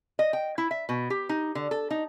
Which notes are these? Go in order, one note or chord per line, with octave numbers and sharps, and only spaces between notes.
D#5
G5
E4
E5
B2
G4
D#4
D3
A4
D#4